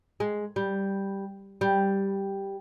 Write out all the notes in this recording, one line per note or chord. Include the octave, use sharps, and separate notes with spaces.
G#3
G3
G3